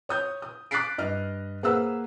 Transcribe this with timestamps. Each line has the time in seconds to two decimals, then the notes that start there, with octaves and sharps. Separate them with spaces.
0.09 C#5 D#6 G6
0.42 D#6
0.71 D6 F#6 A6 B6 C7 D7
0.98 G2 D#5 F6
1.63 A#3 G#4 B4 C5 F#5 E6